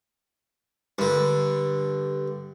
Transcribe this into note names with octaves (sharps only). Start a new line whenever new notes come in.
G2 D3